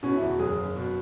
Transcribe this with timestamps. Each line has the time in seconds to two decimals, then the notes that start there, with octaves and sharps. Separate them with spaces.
0.03 B2 C#4
0.15 E4
0.21 E2
0.27 F#4
0.39 F#1 G#4
0.58 F#1
0.76 B2